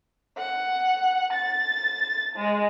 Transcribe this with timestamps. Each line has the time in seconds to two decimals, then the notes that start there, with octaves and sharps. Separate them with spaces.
0.38 F#5
1.32 A6
2.36 G#3